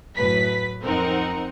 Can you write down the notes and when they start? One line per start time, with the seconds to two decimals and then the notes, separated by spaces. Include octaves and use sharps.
0.17 F#2 A2 B4 B6
0.82 F2 C4 D#4 A#4 F#5